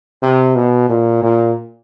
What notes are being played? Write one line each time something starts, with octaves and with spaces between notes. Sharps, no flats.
C3
B2
A#2
A#2